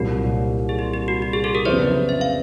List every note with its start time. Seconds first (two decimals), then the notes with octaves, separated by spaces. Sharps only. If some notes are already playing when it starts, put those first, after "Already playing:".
Already playing: C2 A#2 F#3 A#3 F#4
0.69 G#4
0.79 G4
0.94 G4
1.08 F#4
1.22 G4
1.33 G#4
1.44 G4 A4
1.55 G#4 A#4
1.65 F2 C#3 F#3 B3 E4 C5 D5
2.09 E5
2.21 F5